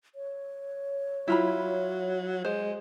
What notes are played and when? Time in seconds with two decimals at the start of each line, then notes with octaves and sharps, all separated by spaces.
0.15 C#5
1.28 F#3 E4 F4 B5
2.45 G#3 C5